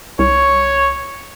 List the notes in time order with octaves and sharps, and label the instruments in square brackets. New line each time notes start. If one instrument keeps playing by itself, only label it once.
[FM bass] C2 [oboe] C#5